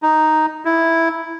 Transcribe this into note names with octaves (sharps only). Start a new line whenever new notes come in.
D#4
E4